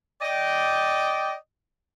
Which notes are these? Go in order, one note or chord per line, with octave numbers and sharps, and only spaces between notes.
D5 D#5 G5